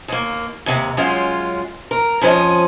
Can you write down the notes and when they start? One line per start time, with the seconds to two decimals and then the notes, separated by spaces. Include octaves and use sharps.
0.08 D#2 A#3
0.66 D#2 C3
0.97 F#2 G#3 C#4 F4
1.91 A#4
2.21 F2 F3 C#4 A#4 D#5